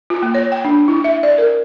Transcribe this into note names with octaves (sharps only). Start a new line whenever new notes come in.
F4
A#3
C#5
G5
D4
E4
E5
D5
A#4